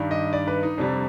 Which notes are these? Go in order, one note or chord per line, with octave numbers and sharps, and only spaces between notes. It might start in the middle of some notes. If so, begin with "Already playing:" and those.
Already playing: G2 D#3 G3
D#5
D5
B4
D#4
F2 C3 G3 D4